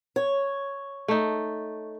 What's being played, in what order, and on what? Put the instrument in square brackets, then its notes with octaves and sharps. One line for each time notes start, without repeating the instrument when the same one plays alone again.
[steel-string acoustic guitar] C#5
[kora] A3 D#4